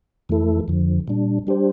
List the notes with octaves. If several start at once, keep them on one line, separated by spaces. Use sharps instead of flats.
F2 E3 A3 E4 A4
F2 D3 F3
A#2 G3 D4
G3 D4 G4 C5